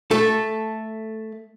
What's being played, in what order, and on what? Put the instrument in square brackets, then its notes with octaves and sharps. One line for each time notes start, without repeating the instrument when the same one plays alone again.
[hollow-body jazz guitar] A3 A4